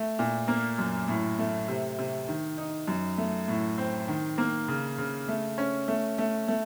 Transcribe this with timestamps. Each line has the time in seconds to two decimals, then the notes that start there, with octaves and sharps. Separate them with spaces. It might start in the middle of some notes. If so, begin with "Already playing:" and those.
Already playing: A3
0.19 A#2
0.48 A#3
0.78 F#2
1.08 A2
1.39 A3
1.68 C3
1.98 C3
2.28 D#3
2.58 D#4
2.88 F#2
3.18 A3
3.48 A2
3.78 C4
4.08 D#3
4.38 A#3
4.68 C#3
4.98 C#3
5.28 A3
5.58 C#4
5.88 A3
6.18 A3
6.48 A3